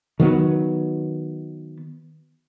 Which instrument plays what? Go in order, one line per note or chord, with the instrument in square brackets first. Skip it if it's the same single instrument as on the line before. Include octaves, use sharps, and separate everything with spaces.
[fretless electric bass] D#3 F#3 B3